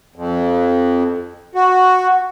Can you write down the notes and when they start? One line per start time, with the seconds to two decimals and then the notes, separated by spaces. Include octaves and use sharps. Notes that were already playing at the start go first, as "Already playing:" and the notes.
0.16 F2
1.55 F#4